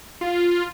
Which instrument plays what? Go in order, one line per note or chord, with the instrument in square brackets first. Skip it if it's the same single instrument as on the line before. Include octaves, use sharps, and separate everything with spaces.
[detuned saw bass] F4